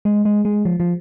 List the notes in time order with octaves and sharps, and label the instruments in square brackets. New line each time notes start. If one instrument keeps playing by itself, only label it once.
[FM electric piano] G#3
G#3
G#3
F3
F3